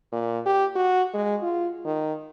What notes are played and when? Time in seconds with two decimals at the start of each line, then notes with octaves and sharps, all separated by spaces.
0.12 A#2
0.46 G4
0.76 F#4
1.14 G#3
1.42 F4
1.85 D#3